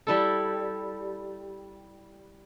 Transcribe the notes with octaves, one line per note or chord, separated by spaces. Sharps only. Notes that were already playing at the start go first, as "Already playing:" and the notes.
G3 E4 A4